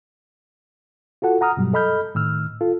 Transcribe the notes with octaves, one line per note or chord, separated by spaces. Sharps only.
F4 F#4 A4 F#5
F#5 A#5 D#6 F6
G2 B2 F#3 G3
A4 D#5 B5 F6 G6
A2 D#3 E6 F6
F4 A4